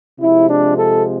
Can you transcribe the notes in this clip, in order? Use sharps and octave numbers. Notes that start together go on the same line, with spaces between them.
C3 F3 G#3 C4 E4
D4
A4